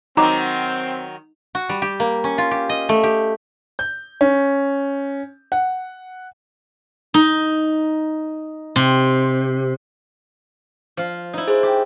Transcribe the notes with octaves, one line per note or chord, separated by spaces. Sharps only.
D#3 F#3 C4 D#4 A#5 D6
F#4
G3
G4
A#3
C#4
F4
G4
D#5
A3
G4
G6
C#4
F#5
D#4
C3
F3 F4
D#4 E4
G#4 C5
G4